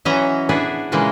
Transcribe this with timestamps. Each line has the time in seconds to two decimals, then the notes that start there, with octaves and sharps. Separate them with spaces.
0.05 E3 F#3 C#4 D#5 E5 A#5
0.49 B3 D4 E4 G#4
0.92 A#2 C#3 E3 G#3 A#3